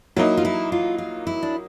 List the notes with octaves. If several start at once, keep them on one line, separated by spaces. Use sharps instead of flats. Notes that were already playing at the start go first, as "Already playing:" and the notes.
F#3 A#3 D#4 E4
F4
E4
F4
F4
E4
D4